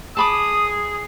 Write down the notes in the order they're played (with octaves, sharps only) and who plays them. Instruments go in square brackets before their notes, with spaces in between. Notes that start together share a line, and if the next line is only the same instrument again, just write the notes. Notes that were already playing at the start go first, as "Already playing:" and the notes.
[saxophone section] G#4 [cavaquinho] A5 B5 D6 [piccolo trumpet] D#6